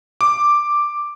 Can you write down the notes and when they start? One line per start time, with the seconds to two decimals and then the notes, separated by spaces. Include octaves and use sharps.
0.21 D6